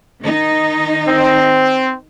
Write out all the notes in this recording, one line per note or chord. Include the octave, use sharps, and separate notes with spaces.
D#3 D#4
C4